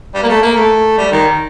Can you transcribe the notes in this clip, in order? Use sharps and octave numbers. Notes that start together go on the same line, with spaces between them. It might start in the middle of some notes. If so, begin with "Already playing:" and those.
G3
A#3
A3
A#3
A3
G3
D#3